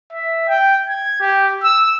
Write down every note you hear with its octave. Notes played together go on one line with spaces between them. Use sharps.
E5
G5
G#6
G4
E6